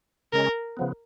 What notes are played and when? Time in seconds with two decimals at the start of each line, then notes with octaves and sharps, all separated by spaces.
0.33 C#3 G#3 C#4 A#4
0.77 C#3 F3 B3